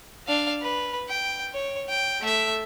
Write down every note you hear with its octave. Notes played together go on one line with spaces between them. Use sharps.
D4 F5
B4
G5
C#5
G5
A3 E5